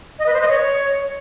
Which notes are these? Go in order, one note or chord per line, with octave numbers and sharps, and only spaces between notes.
D#5
B4
C5
D#5
C#5